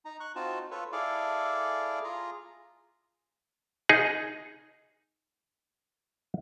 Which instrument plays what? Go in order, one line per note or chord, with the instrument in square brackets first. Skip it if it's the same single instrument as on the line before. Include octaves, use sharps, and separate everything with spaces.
[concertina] D#4 A#5
C#6 F#6
C4 D#4 F4 F#4 A5
F4 A4 B4 C#5
E4 G#4 A4 D5 F5
F4 G#4 A#5
[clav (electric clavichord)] D#4 G#4